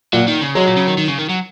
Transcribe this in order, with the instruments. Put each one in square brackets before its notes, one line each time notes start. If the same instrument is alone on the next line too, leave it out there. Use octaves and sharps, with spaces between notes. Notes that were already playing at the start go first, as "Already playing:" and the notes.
[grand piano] A#2 [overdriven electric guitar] F#3
[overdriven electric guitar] D#3
C#3
[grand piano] F#3 [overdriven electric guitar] G#3
[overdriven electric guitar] A#2
C#3
D#3
D#3
C#3
D#3
F#3